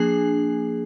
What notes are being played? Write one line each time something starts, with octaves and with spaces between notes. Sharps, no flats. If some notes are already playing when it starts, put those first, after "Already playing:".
Already playing: F3 A#3 D4 G#4 G#5